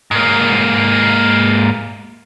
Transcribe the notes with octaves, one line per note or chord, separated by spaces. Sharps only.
G#2 A#3